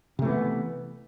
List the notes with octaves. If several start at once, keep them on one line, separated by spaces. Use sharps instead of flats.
C3 E3 A3 B3